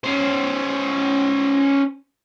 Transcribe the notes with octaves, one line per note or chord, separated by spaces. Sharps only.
C#4 C5